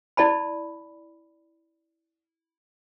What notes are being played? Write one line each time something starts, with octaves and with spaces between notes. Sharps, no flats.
E4 D5 A5 B5